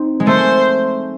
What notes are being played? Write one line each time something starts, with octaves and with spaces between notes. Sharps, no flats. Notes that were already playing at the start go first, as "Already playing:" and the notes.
Already playing: C4 D#4
G#3
A3 C5